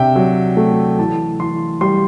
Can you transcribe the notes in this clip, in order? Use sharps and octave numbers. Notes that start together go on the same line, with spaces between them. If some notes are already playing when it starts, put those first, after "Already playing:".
Already playing: C3 D4 E5 G5
F#3
A3
E3 A5
E3 C6
G3 C6